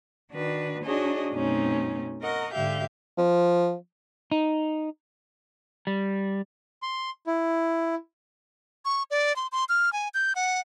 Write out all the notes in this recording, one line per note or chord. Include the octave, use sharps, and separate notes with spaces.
D#3 D4 F#4 B4
D4 D#4 F#4 G#4 C#5 D#5
F#2 B2 A3 C4 C#4 D#4
A#4 D#5 F#5 C#6
G#2 D3 G4 E5 F5 G6
F3
D#4
G3
C6
E4
C#6
D5
C6
C6
F6
G#5
G6
F#5